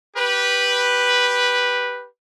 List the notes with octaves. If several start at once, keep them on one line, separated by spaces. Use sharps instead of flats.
G4 B4